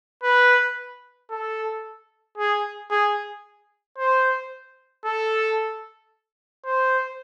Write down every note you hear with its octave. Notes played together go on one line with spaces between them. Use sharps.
B4
A4
G#4
G#4
C5
A4
C5